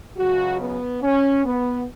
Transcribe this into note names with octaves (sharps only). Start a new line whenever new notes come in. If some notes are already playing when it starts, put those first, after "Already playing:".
C#2 C#3 F#3 F#4
B3
C#4
B3